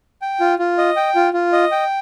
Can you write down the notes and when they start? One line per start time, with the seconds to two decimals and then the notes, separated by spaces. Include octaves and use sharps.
0.22 G5
0.40 F4
0.59 F4
0.78 D#5
0.96 G5
1.15 F4
1.33 F4
1.53 D#5
1.72 G5